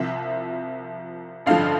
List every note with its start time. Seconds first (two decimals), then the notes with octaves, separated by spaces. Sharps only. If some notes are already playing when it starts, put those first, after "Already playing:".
Already playing: C2 C3 F3 E5
1.46 A1 G2 D3 F3 F5